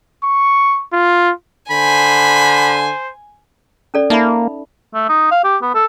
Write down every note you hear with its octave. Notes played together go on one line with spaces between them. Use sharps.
C#6
F4
D3 C5 G#5 B5
C#4 A4 D5
A#3 D#4 E5 B5
A3
D#4
F5
G4
B3
A4